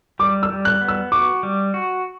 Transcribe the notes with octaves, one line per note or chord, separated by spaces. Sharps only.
G3 D6
E6
G3
F#6
B3
E6
F#4 D6
G3
F#4